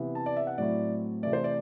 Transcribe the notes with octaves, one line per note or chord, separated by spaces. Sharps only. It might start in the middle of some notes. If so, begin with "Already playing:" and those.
Already playing: C3 E3 B3 E4
A5
D5
E5
F#5
A2 F#3 A3 C4 E4 D5
C3 E3 A3 D5
C5
D5